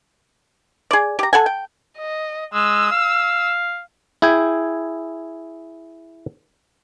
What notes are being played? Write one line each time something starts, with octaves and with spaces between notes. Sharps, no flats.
G#4 D5
G4 A#5
A4 F#5 G#5
G5
D#5
G#3 E6
F5
E4 G#4 G5 G#5